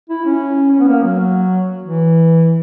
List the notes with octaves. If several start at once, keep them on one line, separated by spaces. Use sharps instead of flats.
E4
C#4
C#4
B3
A#3
F#3
E3